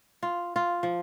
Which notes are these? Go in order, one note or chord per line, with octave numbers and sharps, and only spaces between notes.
F4
F4
F3